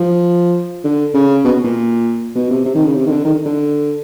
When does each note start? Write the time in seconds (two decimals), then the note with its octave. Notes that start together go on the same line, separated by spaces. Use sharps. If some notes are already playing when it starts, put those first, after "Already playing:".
Already playing: F3
0.84 D3
1.14 C#3
1.45 B2
1.64 A#2
2.35 B2
2.50 C3
2.65 C3
2.75 D#3
2.85 C#3
2.95 C3
3.06 D#3
3.10 D3
3.25 D#3
3.45 D3